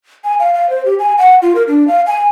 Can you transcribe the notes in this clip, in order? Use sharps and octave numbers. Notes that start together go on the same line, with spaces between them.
G#5
F5
F5
C5
G4
G#5
F#5
F4
A#4
D4
F5
G#5